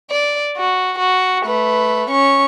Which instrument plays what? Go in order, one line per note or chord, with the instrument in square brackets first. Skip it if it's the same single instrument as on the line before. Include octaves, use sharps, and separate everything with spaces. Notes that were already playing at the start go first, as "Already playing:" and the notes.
[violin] D5
F#4
F#4
A3 B4
C#4 C#6